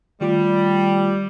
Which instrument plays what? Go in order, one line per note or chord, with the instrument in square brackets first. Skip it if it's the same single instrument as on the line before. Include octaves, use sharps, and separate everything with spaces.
[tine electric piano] D#3 A3 F4 [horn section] G3